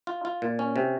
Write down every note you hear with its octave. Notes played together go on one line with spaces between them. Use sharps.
F4
F4
A#2
C#4
C3